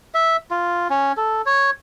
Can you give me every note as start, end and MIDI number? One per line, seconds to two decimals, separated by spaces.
0.14 0.36 76
0.51 0.88 65
0.90 1.12 61
1.17 1.42 69
1.46 1.70 73